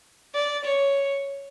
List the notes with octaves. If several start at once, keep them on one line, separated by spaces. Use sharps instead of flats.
D5
C#5